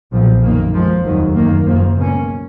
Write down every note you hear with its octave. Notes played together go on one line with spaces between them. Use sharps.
B1 A#2 F3
F#2 D#3 A#3
F2 F3 G#3
F1 D#2 D#3 F#3
F#2 D#3 A#3
F#1 F#2 F3 A#3
C#2 B2 A#3 C#4